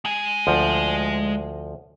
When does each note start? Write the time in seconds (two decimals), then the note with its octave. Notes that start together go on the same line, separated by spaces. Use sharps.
0.05 G#3 G#5
0.47 D2 F3